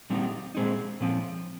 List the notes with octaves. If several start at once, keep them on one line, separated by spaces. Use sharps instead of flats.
A#2 G3 C4 D#4
A#2 G#3 C4 D#4
A#2 F3 C4